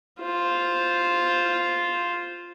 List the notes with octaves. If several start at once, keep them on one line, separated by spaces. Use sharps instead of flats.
F4 C5